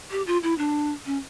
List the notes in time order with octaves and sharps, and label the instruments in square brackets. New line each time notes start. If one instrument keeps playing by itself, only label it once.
[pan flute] G4
F4
E4
D4
C#4